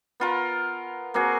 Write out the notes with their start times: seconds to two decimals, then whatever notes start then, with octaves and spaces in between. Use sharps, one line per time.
0.20 B3 F4 A#4
1.14 A#3 C4 F#4 G#4